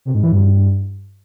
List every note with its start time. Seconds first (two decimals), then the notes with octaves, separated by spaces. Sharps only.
0.05 C3
0.14 G#2
0.23 E3
0.32 G2